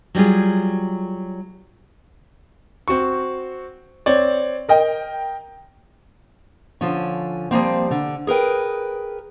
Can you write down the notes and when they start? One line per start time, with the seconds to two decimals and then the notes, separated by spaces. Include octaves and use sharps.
0.15 F#3 G3 F4 G#4
2.88 C4 F#4 C#6
4.06 C4 C#5 D5
4.69 A#4 D#5 G5
6.81 D3 F3 C#4
7.51 F3 G3 A#3 C4
7.91 D3
8.27 G#4 A#4 B4 G5